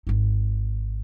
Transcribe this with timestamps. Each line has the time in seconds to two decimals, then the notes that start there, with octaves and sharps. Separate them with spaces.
0.07 G#1 D#4